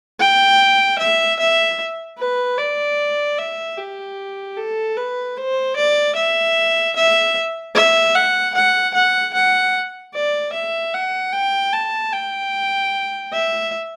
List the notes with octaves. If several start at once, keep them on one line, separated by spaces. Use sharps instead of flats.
G5
E5
E5
B4
D5
E5
G4
A4
B4
C5
D5
E5
E5
E5
F#5
F#5
F#5
F#5
D5
E5
F#5
G5
A5
G5
E5